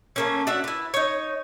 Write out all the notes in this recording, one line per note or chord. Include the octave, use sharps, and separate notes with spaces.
A3 A#3 C#4
D4 F#4 E5 F#5
E4 B4
D#4 C#5